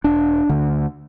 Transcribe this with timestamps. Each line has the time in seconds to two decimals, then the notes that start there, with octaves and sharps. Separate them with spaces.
0.04 E1 D4
0.49 D2 D3